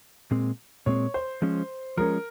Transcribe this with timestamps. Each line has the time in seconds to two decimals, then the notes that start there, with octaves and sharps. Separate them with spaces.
0.31 A#2 G#3 C4
0.86 A#2 G#3 C4 C#5
1.14 C5
1.42 F3 G#3 C#4
1.97 F3 G#3 C#4 A#4